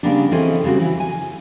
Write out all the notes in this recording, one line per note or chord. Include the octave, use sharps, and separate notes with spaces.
C#3 E3 G3 A#3 B3 D4
E3 C4 C#4 G#4 A4 D#5
C#3 G3 C4 F#4
E3
G#5